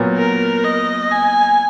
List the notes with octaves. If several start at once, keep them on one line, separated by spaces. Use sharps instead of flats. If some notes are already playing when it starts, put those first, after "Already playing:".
Already playing: A#2 F#3 B3
A#4
D#5
G#5